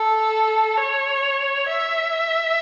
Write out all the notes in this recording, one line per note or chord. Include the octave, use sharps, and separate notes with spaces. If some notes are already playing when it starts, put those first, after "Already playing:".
Already playing: A4
C#5
E5